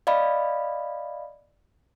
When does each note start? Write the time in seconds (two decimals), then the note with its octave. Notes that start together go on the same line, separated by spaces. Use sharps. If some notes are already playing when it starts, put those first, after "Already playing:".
0.07 D5 D#5 F5 B5